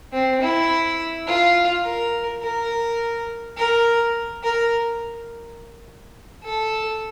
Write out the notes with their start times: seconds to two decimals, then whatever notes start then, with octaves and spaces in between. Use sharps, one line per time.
0.13 C4
0.42 E4
1.28 F4
1.85 A#4
2.42 A#4
3.57 A#4
4.43 A#4
6.44 A4